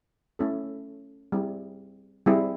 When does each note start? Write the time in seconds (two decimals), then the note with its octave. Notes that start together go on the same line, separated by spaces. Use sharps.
0.39 A3 C#4 E4 A4
1.32 G3 C4 E4 G#4
2.26 G3 C4 E4 G#4